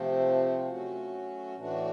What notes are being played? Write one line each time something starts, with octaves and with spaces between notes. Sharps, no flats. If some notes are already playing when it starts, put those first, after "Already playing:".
Already playing: C3 F3 A3 C4
F#3 A3 C#4 F#4
A2 E3 A3 D4 F#4